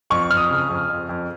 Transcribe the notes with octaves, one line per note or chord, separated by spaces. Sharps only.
F2 C#6
F2 F6
D#6
C#3
F2
F2
F2